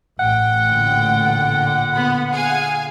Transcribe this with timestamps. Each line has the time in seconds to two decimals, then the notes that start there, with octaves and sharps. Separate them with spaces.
0.20 A1 G2 F#5 G5
0.64 A#2 D3
1.92 B3 B5
2.30 G#4 F5 G#5